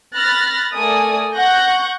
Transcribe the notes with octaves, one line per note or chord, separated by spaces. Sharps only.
B5 F6 F#6 A6 A#6
A3 A4 A#4 D5 G#5 D#6
F#5 C#6 F#6 G6 A#6